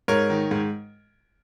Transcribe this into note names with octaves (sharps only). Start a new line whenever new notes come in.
G#2 A#4 C#5
D#3
G#2